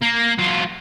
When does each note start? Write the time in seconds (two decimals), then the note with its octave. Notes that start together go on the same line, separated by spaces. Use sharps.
0.02 A#3
0.38 F#3 F4